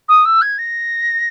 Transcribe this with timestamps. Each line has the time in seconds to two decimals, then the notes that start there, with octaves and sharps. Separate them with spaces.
0.08 D#6
0.25 E6
0.41 G#6
0.58 A#6